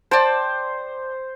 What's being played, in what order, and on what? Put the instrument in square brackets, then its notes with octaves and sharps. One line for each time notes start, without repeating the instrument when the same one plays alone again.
[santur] C5 [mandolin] D5 G5 A5